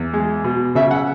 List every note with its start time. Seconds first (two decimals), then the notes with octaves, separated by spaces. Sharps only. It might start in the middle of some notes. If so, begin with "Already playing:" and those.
Already playing: E2
0.13 G#3
0.44 B2
0.75 C#3 E5
0.91 F#5